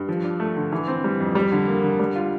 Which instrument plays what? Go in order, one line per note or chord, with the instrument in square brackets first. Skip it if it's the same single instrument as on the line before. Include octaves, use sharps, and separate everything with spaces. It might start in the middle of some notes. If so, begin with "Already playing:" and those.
Already playing: [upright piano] G2
F3
D4
A3
D3
E3
C4
G3
F2
G3
D3
A#3
D3
G3
F4